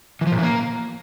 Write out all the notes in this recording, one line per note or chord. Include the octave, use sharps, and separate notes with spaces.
E3
F3
A#2
E3
A#3